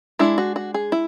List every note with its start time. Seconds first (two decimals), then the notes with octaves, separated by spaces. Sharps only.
0.19 G#3 D4 E4
0.38 F#4
0.56 F#4
0.74 G#4
0.92 E4